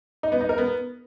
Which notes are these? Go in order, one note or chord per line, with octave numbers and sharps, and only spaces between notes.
D#4
B3
D#4
A#4
B3